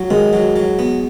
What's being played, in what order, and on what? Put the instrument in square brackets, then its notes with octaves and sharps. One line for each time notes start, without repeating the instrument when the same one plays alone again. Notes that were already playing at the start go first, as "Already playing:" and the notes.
Already playing: [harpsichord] F#3
[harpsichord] D#3 [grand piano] G#3
[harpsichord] F#3
F#3
B3